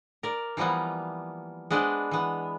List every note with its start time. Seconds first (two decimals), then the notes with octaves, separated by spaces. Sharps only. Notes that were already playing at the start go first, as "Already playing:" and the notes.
0.23 A#4 D5
0.57 E3 F3 G3 A#3 B3
1.70 G#3 B3 D4 B4 C5 D5
2.11 E3 B3